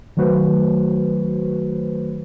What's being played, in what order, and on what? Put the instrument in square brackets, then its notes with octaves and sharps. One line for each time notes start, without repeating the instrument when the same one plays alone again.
[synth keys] D#3 F#3 A3 F#4 B4 C5